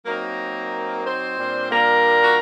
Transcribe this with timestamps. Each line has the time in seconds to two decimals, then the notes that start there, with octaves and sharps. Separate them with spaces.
0.06 F#3 A#3 C4 D#4 A#4
1.04 C4 C5
1.37 A#2 G3 D4
1.70 A#3 A#4
2.23 F#4